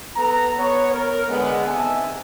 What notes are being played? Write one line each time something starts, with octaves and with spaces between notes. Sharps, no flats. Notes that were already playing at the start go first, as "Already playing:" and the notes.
B3 A4 B4 A#5
B3 C#5
A#4
D3 G#3 B3
C3 D#3 E5 G#5 A5